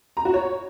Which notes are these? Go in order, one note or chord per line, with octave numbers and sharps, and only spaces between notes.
A#5
F#4
C#5